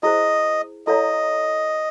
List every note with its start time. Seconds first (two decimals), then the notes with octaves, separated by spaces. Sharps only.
0.03 E4 G#4 C5 D#5
0.87 E4 A4 C#5 D#5 F5 A#5